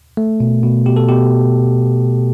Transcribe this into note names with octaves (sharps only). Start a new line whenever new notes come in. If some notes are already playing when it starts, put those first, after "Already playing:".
A3
B2
B2
B2 G4
A4
B2 G4